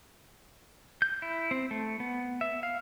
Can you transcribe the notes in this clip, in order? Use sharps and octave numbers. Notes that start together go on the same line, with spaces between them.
G6
E4
C4
A3
B3
E5
F5